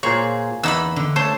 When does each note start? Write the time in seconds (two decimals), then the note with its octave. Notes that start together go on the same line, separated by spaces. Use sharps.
0.03 A#2 A#3 G#4 C5 C#5
0.64 E2 B3 D#4 B5 D#6 E6
0.96 D3
1.16 A3 C5 C#5 A5